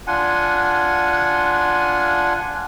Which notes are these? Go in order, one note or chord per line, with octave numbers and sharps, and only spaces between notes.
D4 F4 F#5 G#5